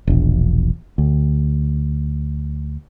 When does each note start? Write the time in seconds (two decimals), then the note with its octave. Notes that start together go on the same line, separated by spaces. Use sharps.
0.07 E1 A#1
0.98 D2